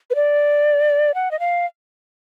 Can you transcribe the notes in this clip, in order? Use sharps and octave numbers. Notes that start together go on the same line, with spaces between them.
B4
D5
F#5
D#5
F5